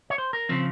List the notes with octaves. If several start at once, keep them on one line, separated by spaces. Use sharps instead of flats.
C#5
C5
A#4
C#3 F3 C4